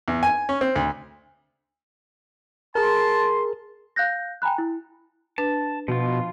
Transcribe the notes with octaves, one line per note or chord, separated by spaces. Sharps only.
E2
G#5
C#4
C4
D2
G#4 A#4 A5 C6
F5 F#6 G6 A#6
G5 G#5 A#5 B5 F#6
E4
D4 B4 A5
B2 F3 F4